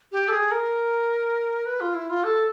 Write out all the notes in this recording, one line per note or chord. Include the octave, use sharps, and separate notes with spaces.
G4
A4
G#4
A#4
B4
F4
E4
F4
A4